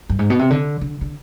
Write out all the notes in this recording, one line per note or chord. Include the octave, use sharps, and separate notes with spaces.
G2
G#2
B2
C3
D3
D3
D3